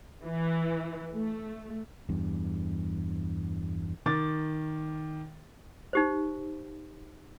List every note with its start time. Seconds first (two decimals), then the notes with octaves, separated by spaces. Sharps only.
0.24 E3
1.13 A3
2.09 E2 G2
4.06 D#3 D6 A6
5.93 D#4 G4 C5